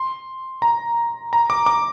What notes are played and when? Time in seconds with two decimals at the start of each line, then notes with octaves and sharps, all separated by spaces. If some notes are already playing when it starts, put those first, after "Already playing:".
Already playing: C6
0.62 A#5
1.33 A#5
1.50 D6
1.66 D6